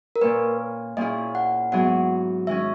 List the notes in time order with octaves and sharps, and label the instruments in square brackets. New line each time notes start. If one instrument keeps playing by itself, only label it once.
[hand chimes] A#4
[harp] A#2 A#3 C#4 [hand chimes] B4
[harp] A#2 A#3 C#4 E4 G#4 [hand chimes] D#5
[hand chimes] F#5
[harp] G#2 F#3 B3 E4 G#4 [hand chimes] F#5
[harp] D#3 G#3 C#4 [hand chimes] E5